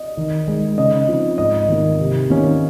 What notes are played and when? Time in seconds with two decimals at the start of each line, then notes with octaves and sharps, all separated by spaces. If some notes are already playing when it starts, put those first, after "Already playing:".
Already playing: D#5
0.17 D#3
0.48 G#3 D#4
0.77 C#3 D#5
1.08 F3 C4 D#4
1.38 G#2 D#5
1.68 D#3 A#3
1.99 C3
2.30 D#3 A#3 C#4